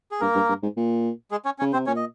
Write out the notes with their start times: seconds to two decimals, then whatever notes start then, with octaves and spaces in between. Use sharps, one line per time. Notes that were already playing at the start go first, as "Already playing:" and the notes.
0.11 G#4
0.21 G2 A#3 A#4
0.35 G2
0.49 G2
0.63 G#2
0.77 A#2
1.31 G#3 G#4
1.45 C#4 C#5
1.59 C#3 C#4 C#5
1.73 C3 C4 C5
1.86 A#2 C#4 C#5
1.96 D#5